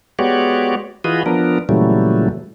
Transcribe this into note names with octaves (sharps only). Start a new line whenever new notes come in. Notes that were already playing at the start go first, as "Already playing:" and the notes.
G#3 B3 F#4 G4 C#5 D5
E3 F4 F#4 G#4 B4 D#5
F3 B3 D4 A#4
A#2 C#3 E3 F#3 G3 A3